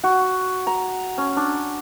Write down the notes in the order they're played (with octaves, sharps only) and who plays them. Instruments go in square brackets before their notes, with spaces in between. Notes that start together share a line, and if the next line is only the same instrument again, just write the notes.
[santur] F#4
A#5
C#4
D4